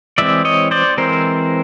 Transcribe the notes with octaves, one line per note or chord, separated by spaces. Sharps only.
E3 G#3 C4 D5 E5
C#5 D#5
C5 D5
E3 G#3 C4 A#4 C5